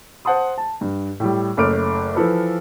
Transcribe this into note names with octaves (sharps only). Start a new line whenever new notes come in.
C5 F#5 A5 C6 D#6
A5
G2
A2 G3
F#1 A3 C#5 D6 F6 D7
E3 F3 A4 B4